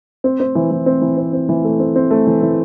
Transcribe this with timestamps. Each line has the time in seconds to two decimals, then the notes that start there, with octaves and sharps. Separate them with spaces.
0.24 C4
0.40 C4
0.55 E3
0.71 E3
0.86 C4
1.02 E3
1.17 C4
1.33 C4
1.49 E3
1.64 A3
1.79 C4
1.96 C4
2.11 A3
2.27 E3
2.42 E3